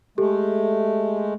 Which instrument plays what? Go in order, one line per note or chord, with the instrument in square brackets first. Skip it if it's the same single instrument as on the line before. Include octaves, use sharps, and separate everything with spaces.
[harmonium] G#3 A3 [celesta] G4 A4